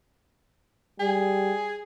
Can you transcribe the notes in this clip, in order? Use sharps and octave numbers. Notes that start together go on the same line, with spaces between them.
G3 G#4